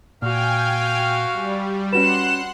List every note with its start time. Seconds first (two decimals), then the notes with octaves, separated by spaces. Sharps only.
0.22 A#2 F#4 F5 G5 G#5 F6
1.32 G3
1.93 C#4 F#4 B4 F#5 C6 F#6 E7